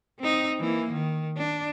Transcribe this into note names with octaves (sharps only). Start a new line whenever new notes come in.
C4 D#4
E3 A#3
D#3
D4